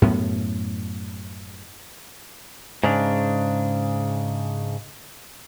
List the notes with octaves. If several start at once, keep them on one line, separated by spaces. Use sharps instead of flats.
F#2 A2 B3
G#2 C#3 D4